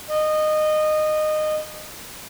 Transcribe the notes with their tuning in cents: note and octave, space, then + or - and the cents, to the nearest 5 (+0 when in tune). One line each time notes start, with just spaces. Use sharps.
D#5 -20